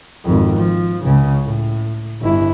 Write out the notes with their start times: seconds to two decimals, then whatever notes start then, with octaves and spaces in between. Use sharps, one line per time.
0.25 G#1 F2
0.59 F3
1.05 C#2 C#3
1.43 A2
2.22 G1 E4